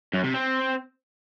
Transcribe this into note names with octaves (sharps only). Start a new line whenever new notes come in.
F#2
C3
C4